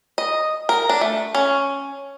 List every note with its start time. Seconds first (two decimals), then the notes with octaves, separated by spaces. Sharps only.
0.18 D#5
0.69 A#4
0.89 D4
1.01 A3
1.35 C#4